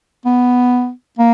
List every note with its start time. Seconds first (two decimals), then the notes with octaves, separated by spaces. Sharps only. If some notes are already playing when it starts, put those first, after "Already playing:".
0.25 B3
1.18 A#3